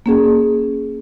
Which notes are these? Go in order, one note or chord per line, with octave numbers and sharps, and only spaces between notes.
A#3 C#4 G#4